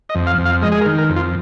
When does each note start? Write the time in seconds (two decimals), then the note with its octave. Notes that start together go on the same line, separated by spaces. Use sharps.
0.09 D#5
0.15 F2
0.27 F5
0.38 F2
0.46 F5
0.62 G#3 D#5
0.72 G#4
0.81 A#4
0.86 D#3
0.98 A#4
1.09 F2
1.16 F4